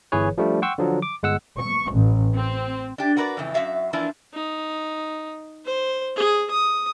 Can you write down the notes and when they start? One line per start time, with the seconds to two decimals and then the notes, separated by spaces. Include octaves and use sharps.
0.12 G1 E3 G#4 B4 C#5
0.38 F3 G3 A3 D4
0.62 F#5 G5 C6 C#6 E6
0.78 D3 F3 F#3
1.02 D6
1.22 G1 G#3 F#5 E6
1.60 C#6
1.91 A1
2.36 C4
2.98 D4 G4
3.17 F#4 A#4 B4 C#5 D5
3.37 F2 A2 C#3 E3
3.54 F#2 B3 F#4 E5 F5
3.93 E3 F3 A#3 D4 E4
4.34 D#4
5.65 C5
6.16 G#4
6.51 D#6